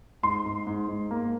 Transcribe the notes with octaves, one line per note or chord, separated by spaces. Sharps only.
G#2 C6
G#2
G#2
G#2
A#3